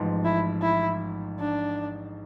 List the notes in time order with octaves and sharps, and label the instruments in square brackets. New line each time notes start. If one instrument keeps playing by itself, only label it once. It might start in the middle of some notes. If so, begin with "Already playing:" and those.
Already playing: [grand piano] A1 G#2 F3
[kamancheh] E4
E4
D4